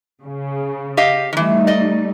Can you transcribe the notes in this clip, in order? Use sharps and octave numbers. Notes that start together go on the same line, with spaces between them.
C#3
G4 D#5 F5
D#3 E3 G3 A3 D#4
D5 D#5